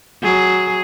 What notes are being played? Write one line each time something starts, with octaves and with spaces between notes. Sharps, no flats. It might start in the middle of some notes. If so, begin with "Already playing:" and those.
F#3 G#4